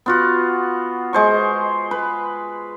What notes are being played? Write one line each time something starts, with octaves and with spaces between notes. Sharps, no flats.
B3 F4 F#4
G#3 C5 C#6
B4